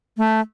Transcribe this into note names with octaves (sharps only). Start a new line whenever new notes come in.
A3